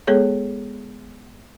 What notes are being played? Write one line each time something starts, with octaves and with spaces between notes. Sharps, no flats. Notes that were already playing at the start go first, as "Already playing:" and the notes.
G#3 B3 G#4 A4 C#5